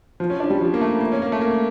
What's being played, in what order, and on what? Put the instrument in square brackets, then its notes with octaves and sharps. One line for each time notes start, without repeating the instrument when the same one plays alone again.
[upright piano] F3
C#4
D4
G3
F3
A#3
A3
A#3
C#4
A#3
A3
A#3